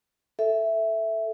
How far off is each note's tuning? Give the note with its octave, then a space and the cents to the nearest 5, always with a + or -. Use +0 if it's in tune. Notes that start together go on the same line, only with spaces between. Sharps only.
A4 +0 E5 +0